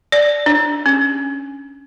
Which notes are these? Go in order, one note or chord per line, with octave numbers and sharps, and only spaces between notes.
D5
D4
C#4